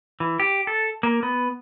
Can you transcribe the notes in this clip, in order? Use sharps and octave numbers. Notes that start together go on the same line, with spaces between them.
E3
G4
A4
A#3
B3